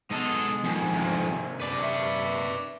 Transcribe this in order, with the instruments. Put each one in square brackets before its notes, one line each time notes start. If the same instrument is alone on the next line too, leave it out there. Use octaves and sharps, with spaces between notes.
[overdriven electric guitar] G#3 D#5 [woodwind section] B3 [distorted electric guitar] D#4 A4
[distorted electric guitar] F2 G#2 [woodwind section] D#3 G#5
[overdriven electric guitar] C3 A#3
[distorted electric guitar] B4 D5
[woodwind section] E5 C#6